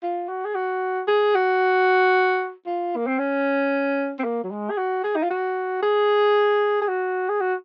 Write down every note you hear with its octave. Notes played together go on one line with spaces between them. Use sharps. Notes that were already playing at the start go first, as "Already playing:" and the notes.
F4
F#4
G#4
F#4
G#4
F#4
F4
A#3
C4
C#4
C4
A#3
F#3
G#3
G#4
F#4
G#4
D#4
F4
F#4
G#4
G#4
F#4
G#4
F#4